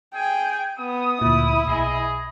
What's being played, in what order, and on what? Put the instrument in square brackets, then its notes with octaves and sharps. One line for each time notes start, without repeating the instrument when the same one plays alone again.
[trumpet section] G#4 G#5 [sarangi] G5
[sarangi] B3 [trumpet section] D#6
[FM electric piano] D2 A#2 [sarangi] E4
[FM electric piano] B1 [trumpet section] G#4 D#5